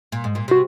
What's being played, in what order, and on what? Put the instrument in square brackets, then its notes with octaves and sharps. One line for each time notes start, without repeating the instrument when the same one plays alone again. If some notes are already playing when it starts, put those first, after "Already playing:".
[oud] A#2
G#2
A#2
[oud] C3 [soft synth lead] F#4